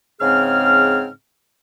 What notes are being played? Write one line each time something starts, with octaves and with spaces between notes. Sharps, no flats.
G#2 C#3 C4 G#4 F6